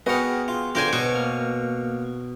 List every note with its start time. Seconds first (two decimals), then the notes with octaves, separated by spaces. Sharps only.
0.06 B3 F#4 G#4 D#5 F#5 G5 F6
0.48 F4
0.75 D3 F4 G4 A#4 C5 G#5
0.93 B2 C#5
1.14 A#3 F6